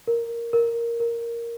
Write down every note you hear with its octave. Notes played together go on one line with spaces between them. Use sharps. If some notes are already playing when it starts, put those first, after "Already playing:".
A#4
A#4
A#4